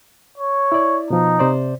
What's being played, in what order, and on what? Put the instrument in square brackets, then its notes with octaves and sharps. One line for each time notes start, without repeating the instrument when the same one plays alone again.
[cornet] C#5
[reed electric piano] E4 D5
[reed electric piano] B2 F3 [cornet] D#4
[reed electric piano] C3 C5 D5